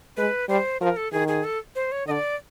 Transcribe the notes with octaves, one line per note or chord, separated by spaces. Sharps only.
G#3 B4
G3 C5
F3 A#4
A4
D#3 G#4
G#4
A4
C5
C#5
D3 D#5
D5